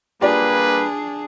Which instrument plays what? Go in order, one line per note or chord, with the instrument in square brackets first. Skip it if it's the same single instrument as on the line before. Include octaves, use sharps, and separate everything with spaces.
[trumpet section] G3 A#3 B4 [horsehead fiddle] D4 G#4 [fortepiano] F4 G4 D5